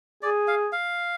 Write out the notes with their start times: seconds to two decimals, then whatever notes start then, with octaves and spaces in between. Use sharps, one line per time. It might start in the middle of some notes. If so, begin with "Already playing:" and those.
0.23 G#4 D5
0.48 F5
0.72 F5